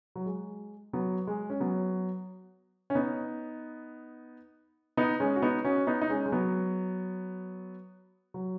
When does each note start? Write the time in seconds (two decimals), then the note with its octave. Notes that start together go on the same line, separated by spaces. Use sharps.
0.16 F#3
0.26 G#3
0.93 F#3 B3
1.27 G#3
1.50 C#4
1.60 F#3 B3
2.90 C#4
2.95 B3 D#4
4.97 B3 D#4
5.20 G#3 C#4
5.36 F#4
5.42 B3 D#4
5.64 C#4 F#4
5.87 B3 D#4
6.02 D#4
6.10 G#3 C#4
6.26 G#3
6.32 F#3 B3
8.34 F#3